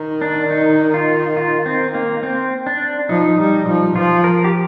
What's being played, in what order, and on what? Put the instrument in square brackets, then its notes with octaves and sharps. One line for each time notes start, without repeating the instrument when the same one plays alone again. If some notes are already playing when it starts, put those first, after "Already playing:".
Already playing: [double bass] D#3
[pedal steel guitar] D4
D#4
F4
F4
C4
A#3
C4
D4
[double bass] F3 [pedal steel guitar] D#4
[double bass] G3
F3
[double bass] F3 [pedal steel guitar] F4
[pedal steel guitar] A#4
G4